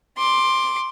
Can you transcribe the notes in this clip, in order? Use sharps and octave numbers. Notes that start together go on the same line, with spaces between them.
C6 D6